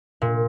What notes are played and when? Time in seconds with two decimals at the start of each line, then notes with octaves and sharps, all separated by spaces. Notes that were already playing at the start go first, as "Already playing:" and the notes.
0.22 A#2